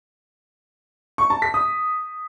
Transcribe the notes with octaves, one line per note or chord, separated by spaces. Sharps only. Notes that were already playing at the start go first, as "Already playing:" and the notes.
C#6
A5
B6
D#6